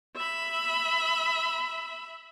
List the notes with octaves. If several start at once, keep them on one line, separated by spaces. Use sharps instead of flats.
E5 B5